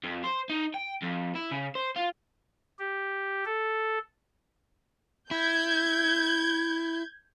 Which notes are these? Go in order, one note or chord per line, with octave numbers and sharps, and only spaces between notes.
F2
C5
D#4
G5
F2
E4
C#3
C5
F4
G4
A4
E4 G6 G#6